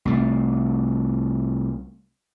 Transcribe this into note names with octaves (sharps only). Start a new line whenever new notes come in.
C2 A3